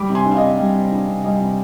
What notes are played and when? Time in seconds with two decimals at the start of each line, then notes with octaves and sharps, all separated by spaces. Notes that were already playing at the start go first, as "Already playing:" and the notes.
Already playing: G3 B5 D6
0.09 C3
0.15 G#5 C6
0.25 D4
0.31 F5
0.37 D#5
0.42 C3
0.59 G3
0.75 C3
0.91 D4
1.08 C3
1.24 G3 D#5
1.41 C3